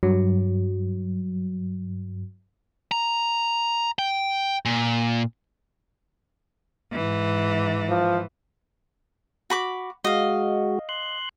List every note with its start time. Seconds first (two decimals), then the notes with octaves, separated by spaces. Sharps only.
0.03 G2 F#3
2.92 A#5
3.99 G5
4.65 A#2
6.93 G#2 E3
7.89 F3
9.50 F#4 B5 D6
10.04 G#3 F#4 D#5 F5
10.89 C6 F#6